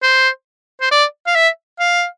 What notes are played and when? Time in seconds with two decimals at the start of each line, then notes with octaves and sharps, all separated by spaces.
0.03 C5
0.81 C5
0.91 D5
1.27 F5
1.35 E5
1.79 F5